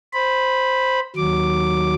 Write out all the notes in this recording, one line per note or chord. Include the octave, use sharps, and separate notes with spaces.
C5 B5
D#2 F#3 D6